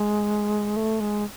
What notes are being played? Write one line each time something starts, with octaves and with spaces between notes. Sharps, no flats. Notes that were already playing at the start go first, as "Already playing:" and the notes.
Already playing: G#3
A3
G#3